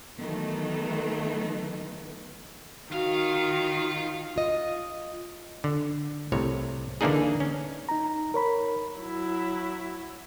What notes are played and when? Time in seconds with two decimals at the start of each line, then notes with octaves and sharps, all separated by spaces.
0.20 D#3 E3 F#3 A3 B3
2.92 D#3 F4 F#4 F5
4.36 F4 D#5
5.64 D3
6.32 C2 A2 C3 C#5
7.01 D3 E3 A#3 D4 D#4 G#4
7.40 C#4
7.89 D#4 A#5
8.34 A#4 C#5 B5
8.99 F#3 E4